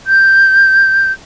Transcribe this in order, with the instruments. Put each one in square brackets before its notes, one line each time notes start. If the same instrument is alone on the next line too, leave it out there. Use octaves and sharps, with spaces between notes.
[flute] G6